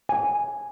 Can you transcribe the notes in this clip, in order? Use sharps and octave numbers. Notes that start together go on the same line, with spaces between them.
G#5